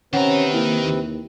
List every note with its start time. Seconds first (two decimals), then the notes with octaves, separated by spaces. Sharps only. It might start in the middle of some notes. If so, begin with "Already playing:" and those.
0.13 C3 D#3 C4 C#4 B4 F#5 A#5
0.54 A#3 E4
0.84 D#2